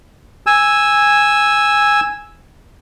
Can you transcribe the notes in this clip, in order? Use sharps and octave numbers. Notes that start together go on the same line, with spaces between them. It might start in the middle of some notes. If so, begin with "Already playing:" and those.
G#5 E6